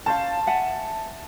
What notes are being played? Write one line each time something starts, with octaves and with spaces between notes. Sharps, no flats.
C#4 C5 F5 A5
E5 F#5 G#5